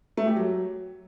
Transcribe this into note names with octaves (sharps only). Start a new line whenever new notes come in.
A3
G4
F#3